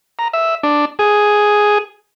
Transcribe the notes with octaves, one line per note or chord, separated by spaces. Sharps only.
A#5
E5
D4
G#4